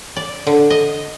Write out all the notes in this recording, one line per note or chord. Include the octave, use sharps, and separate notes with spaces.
D5
D3
D#5